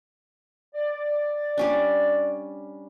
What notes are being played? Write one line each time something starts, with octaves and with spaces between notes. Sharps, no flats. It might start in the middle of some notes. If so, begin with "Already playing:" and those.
D5
G3 C#4 D4